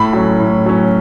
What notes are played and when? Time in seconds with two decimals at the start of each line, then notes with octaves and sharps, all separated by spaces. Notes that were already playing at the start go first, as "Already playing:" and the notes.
Already playing: A2 B5
0.13 F#3 C#4
0.40 A2
0.66 F#3 C#4